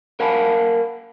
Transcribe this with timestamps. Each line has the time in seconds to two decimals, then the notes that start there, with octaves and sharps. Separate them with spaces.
0.20 A#4 F5 F#5 G#5 A5 B5